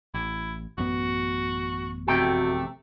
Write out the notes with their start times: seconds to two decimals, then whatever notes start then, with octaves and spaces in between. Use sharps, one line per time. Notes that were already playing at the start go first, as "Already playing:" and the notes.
0.14 A1 E4
0.78 A1 F#2 B3 F#4
2.08 F2 C3 A3 F#4 G5